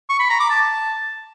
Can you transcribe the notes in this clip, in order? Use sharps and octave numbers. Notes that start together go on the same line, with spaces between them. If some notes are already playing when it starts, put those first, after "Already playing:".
C#6
B5
A#5
D6
A5